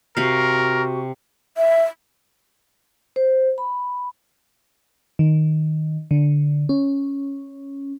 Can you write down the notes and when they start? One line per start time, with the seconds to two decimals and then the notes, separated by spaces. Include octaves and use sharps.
0.17 C3 F#4 A#4 F5
1.57 E5
3.16 C5
3.58 B5
5.19 D#3
6.11 D3
6.69 C#4